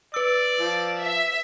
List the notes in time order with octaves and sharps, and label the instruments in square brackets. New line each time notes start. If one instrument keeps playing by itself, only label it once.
[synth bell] B4 E6 [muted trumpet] D5
[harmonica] F3
[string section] E5